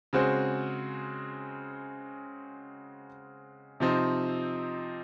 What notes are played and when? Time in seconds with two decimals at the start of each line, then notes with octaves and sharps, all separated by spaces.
0.13 C#3 G#3 C4 F#4 C5
3.80 C3 F3 C4 D#4